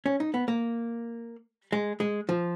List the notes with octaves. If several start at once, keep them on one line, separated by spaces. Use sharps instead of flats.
C#4
D#4
B3
A#3
G#3
G#3
F3